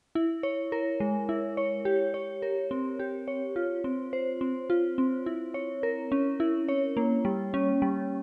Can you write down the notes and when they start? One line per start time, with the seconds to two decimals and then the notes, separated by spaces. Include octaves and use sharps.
0.15 E4
0.43 C#5
0.72 A#4
1.00 G#3
1.29 E4
1.57 C#5
1.85 G4
2.14 C#5
2.42 A#4
2.71 C4
2.99 G4
3.28 C#5
3.56 F4
3.84 C4
4.13 C5
4.41 C4
4.70 F4
4.98 C4
5.26 E4
5.54 C#5
5.83 A#4
6.12 C#4
6.40 E4
6.69 C#5
6.97 A#3
7.25 G3
7.54 C#4
7.82 G3